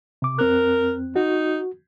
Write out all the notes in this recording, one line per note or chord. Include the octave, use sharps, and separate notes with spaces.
C3 D6
F2 C4 A#4 F#6
D#4 F#4